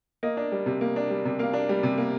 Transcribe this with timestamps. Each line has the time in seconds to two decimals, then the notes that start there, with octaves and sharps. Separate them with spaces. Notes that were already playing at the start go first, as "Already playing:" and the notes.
0.23 A#3 D#5
0.37 D4
0.52 G3
0.66 C3
0.81 A#3
0.96 D4
1.10 G3
1.25 C3
1.39 A#3 F5
1.53 D4
1.69 G3
1.83 C3
1.98 A#3